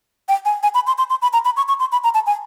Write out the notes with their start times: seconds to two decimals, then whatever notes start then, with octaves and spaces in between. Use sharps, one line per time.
0.29 G5
0.45 G#5
0.63 G#5
0.74 B5
0.87 C6
0.98 C6
1.10 C6
1.22 B5
1.33 A#5
1.45 B5
1.57 C#6
1.68 C#6
1.80 C6
1.92 B5
2.04 A#5
2.14 A5
2.27 G#5